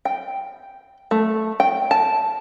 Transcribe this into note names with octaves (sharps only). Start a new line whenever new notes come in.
G5
A3
G5
A5